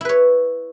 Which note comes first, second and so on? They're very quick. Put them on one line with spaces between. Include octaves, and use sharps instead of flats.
E4 B4 C#5